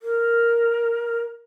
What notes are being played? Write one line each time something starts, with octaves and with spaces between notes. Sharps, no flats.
A#4